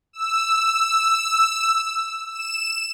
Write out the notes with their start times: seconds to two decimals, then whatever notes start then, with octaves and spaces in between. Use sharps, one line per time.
0.13 E6
2.30 E7